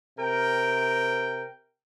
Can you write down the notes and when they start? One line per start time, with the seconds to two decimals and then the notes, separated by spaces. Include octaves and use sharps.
0.19 C3 A#4 G5